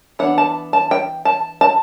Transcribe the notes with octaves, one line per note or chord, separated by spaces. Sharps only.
E3 B3 D4 F#5
A5
A5
G5
A5
A5